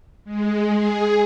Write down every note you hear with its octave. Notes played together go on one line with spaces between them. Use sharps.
G#3
G#4